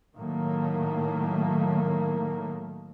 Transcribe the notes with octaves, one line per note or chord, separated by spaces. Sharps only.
A2 D#3 F#3 A3 A#3